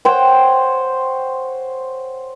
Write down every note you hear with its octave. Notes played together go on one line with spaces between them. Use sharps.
C5 C#5 F#5 G5